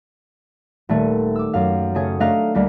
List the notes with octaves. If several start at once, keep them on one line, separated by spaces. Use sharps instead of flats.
D#1 A3 D#7
D6 E6
F#2 F5
C#3 A3 G#4 C#5
A3 D4 D#5 F5 A#5 F#6
D2 G3 A#3